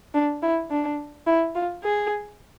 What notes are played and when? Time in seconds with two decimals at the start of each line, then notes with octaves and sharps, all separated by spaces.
0.14 D4
0.42 E4
0.70 D4
1.26 E4
1.55 F4
1.83 G#4